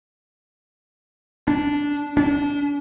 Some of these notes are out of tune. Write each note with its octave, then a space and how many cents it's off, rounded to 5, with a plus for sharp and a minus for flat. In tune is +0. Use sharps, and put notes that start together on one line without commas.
D4 -10
D4 -30